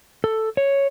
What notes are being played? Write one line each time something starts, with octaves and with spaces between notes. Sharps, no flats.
A4
C#5